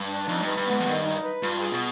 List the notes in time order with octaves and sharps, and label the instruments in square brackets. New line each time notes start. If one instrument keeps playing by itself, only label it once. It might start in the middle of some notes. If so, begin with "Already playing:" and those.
Already playing: [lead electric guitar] G2
[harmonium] D4
[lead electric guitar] F2 [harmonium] D#4
[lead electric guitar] G2 [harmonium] B4
[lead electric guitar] G2
[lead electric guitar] G#2 [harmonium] B3
[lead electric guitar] F2
[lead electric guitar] G2 [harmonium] D#3
[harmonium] D#4
B4
[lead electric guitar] G2 [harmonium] F4
[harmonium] G#4
[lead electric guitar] B2